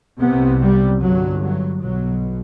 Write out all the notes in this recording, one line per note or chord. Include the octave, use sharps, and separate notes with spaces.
C2 C3 B3
G3
G1 G2 F#3
F#3
B1 B2 F#3